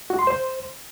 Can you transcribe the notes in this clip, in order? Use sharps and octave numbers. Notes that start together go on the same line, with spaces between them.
F#4
C6
C5